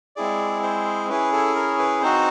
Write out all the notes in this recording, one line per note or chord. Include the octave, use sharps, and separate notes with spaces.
G#3 C4 E4 G#4 D5
C5
C#4 E4 G#4 B4
A4
A#4
B4
C4 D#4 F#4 C5